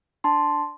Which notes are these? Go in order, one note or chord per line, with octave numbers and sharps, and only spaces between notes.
D4 A5 C6